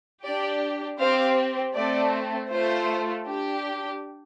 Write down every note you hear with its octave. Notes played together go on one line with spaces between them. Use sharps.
D4 G4 D5
C4 G4 C5 F5
A3 C4 A4 D5
A3 F4 A4 C5
D4 G4